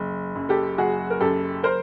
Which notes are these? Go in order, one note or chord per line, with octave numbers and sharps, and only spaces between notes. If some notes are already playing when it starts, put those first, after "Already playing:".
Already playing: F#1
F#2
G4 A4
F#1 F#4 G#4
A#4
F#2 G4 A4
A#4 C5